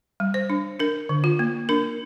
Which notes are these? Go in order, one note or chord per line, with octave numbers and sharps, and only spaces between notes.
G3
C5
D4
D4 A#4
D3
F4
A#3
D4 A#4